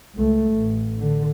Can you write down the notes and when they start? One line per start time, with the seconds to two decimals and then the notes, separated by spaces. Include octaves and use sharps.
0.15 C#2 A3
0.53 A1
0.99 D3